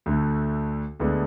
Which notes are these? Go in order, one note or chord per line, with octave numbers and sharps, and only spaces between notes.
D2 D3 A3
D2 D3 G#3 B3 D4